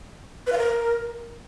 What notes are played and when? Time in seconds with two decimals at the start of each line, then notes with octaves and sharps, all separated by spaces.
0.47 B4
0.52 F5
0.58 A#4